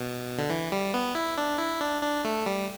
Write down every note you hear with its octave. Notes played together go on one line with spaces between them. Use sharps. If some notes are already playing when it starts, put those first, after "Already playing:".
Already playing: B2
D3
E3
G3
B3
E4
D4
E4
D4
D4
A3
G3